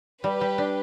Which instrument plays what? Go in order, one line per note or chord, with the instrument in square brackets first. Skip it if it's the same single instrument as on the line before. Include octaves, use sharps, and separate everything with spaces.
[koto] G3 [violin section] G4 B4
[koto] G3
D4